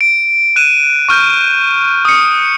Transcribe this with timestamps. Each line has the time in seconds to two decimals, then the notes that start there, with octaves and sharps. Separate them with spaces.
0.01 D7
0.56 F#6 D#7 E7
1.09 C#6 F6 G6
2.05 D#6 C#7